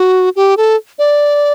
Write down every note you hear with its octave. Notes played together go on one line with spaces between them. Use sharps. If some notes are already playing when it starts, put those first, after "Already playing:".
Already playing: F#4
G4
A4
D5